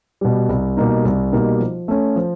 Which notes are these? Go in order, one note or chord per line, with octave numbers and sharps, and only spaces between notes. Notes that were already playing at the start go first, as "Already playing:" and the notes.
B2 G3
C2
B2 G3 A#3 D#4
C2
B2 G3 A#3 D#4
F3
A3 C#4
F3